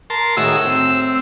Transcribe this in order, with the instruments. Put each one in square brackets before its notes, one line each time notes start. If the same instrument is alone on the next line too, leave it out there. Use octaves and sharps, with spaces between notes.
[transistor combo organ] A#4 A5 C6
[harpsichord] A2 D#6 [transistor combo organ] D#3 F#4 G#4 [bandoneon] E6
[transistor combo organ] C4